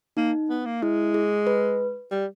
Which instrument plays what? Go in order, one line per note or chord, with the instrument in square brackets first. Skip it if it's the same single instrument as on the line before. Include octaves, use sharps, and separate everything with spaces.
[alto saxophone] A#3 [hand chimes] D#4
[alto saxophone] B3
A#3
[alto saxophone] G#3 [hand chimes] E4
[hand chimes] G#4
B4
[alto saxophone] G3